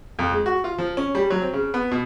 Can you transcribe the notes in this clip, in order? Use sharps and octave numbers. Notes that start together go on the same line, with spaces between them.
F2
G#3
F#4
F4
F3
C#4
G3
F#3
C4
C#3
B3
B2